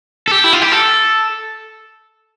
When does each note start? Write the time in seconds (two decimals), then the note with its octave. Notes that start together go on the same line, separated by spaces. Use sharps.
0.28 A4
0.31 G4
0.44 E4
0.53 F4
0.62 G4
0.72 A4